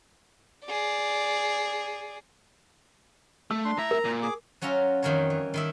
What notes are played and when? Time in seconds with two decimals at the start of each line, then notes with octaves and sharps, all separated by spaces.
0.66 G#4 D5
3.51 A3 E6
3.65 D4 C6
3.78 A2 E5 A#5
3.91 A#4
4.05 A#2
4.23 G#4 D6
4.62 F#3 C#4 F4 E5 A#5
5.03 F2 D#3 E3 G3 A#4 C#5
5.30 E3
5.54 D#3 E4 E5